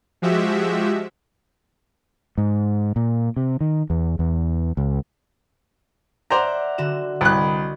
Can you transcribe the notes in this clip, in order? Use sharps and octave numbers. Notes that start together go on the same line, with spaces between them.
F3 G#3 F#4 G4 E5
G#2
A#2
C3
D#3
E2
E2
C#2
C5 D5 E5 F#5 A#5
D3 F#4 E7
C2 B4 D#5 F#6